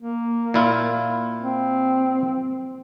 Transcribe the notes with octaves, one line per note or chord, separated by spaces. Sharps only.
A#3
A#2 E4 F4
C4